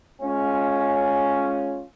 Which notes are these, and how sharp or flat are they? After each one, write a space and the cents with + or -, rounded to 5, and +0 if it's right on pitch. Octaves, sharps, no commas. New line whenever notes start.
G#3 +25 C#4 +0 F4 +10